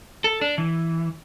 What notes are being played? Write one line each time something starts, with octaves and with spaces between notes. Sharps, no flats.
A4
D4
E3